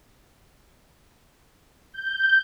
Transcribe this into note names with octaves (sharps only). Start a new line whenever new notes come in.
G6